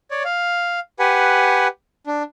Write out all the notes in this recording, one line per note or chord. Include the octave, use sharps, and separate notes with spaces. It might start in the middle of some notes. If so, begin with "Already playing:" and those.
C#5 D5
F5
G4 B4 F#5 G#5
D4